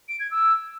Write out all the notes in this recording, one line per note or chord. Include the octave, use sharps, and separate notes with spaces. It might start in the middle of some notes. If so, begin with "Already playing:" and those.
D7
G#6
E6